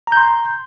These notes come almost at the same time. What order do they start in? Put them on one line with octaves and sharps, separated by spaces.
A#5 G6 C6